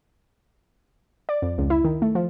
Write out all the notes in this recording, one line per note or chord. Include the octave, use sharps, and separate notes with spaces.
D5
F2
C#2
E4
D#3
A3
F3